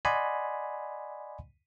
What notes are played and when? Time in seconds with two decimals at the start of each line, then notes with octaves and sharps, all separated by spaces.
0.05 D5 D#5 F#5 G#5 B5 C6